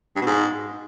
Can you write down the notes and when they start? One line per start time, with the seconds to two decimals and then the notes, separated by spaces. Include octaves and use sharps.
0.16 G2
0.21 B2
0.26 G#2